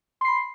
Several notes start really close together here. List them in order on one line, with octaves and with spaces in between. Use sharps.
C6 C7 B5